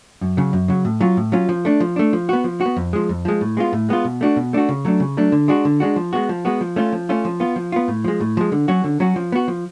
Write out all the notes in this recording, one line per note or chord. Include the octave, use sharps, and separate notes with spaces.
F#2
C#3 F#3
F#2
C#3 F#3
A2
F#3 C#4 F4
A2
F#3 C#4 F4
F3
A3 D4
F3
A3 D4
F3
B3 F#4
F3
F#4
B3
F2
F3 G#3
F2
F3 G#3
A2
G#3 B3 F4
A2
G#3 B3 F4
B2
A3 D4 F#4
B2
A3 D4 F#4
C#3
F#3 A3 D4
C#3
F#3 A3 D4
D3
G#3 D4 F#4
D3
G#3 D4 F#4
F3
G#3 B3 F#4
F3
G#3 B3 F#4
F3
A3 C#4 F4
F3
A3 C#4 F4
F3
B3 F4
F3
B3 F4
A2
F3 G#3
A2
F3 G#3
D3
F#3 C#4 F#4
D3
F#3 C#4 F#4
F3
B3 F#4
F3